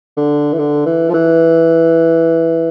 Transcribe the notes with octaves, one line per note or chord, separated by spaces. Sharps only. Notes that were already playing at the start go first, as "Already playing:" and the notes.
D3
E3
D3
E3
F3
E3